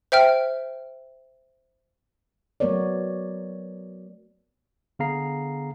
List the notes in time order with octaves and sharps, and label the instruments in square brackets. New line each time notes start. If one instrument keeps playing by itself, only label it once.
[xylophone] C5 E5 G5 F6
[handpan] F#3 A3 B3 A#4 C#5 D5
[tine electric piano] D3 B3 G#4 F5 A#5 C7